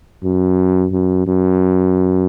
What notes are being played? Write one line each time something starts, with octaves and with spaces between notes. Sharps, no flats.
F#2
F#2
F#2